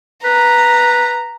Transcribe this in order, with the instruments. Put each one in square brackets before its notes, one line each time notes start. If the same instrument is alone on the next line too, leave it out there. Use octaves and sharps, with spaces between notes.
[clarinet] B4 [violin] A#5